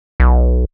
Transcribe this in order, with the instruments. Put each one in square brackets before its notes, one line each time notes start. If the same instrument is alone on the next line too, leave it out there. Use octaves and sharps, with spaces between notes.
[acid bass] B1